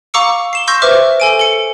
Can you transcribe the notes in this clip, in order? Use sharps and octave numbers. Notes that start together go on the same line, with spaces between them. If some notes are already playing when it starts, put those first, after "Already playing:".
F5 A#5 C#6 D6 E6 C#7
C7 E7 G7
C6 C#6 E6 G6 A#6
B4 C5 E5 D6 F6
A4 G#5 D7
A4 C#7